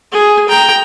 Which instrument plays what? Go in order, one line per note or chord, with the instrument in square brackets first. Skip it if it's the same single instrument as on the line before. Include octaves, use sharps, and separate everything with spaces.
[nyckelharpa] G#4
G5 A#5